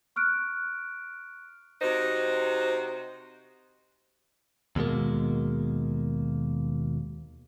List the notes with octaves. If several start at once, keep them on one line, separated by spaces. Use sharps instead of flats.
C#6 F6 F#6 D7
C3 D#4 F#4 C5
D#2 B2 G#3 A#3